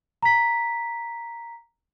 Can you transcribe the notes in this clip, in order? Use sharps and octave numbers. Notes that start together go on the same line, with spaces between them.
A#5 B6